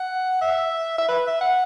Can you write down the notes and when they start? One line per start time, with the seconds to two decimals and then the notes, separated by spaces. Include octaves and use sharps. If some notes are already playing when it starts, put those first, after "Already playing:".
Already playing: F#5
0.41 E5
0.98 E5
1.08 B4
1.27 E5
1.41 F#5